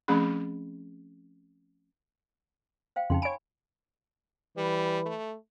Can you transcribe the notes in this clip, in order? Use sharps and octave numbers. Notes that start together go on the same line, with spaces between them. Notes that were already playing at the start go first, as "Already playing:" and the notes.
F3 A3 C4 C#4 G#4 B5
C5 F5 G5
F2 C#3 D#4 G5 C6
C#5 G#5 B5 D7
E3 G3 B4
A3